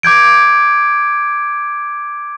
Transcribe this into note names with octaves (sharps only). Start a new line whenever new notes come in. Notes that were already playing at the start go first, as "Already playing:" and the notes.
D6 G6 G#6 D7